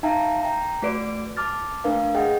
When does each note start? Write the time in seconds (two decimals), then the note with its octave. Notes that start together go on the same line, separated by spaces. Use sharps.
0.03 D#4 E5 F5 G5 A5 A#5
0.41 G5 A#5
0.82 A3 F#4 B4 D5 D7
1.37 A5 D6 F6 A6
1.84 A3 A#3 D4 A#4 B4 F5
2.14 G#4 D#5 F#5 G5